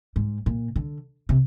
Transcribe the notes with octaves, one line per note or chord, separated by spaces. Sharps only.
G#2
A#2
D3
C3